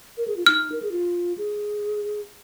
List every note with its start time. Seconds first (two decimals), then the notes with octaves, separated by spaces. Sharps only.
0.17 A#4
0.28 G#4
0.37 F4
0.46 D#4 F6
0.72 A#4
0.82 G#4
0.92 F4
1.38 G#4